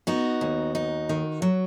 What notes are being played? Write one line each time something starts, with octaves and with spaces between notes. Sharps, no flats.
B3 D#4 F#4
D#2
D#4
D#3
F#3